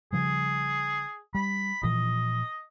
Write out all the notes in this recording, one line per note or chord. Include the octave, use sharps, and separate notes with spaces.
C#3 F3 G3 G#4
G3 B5
A#2 E3 F3 D#5